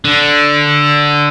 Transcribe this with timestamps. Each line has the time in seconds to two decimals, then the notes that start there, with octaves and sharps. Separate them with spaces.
0.05 D3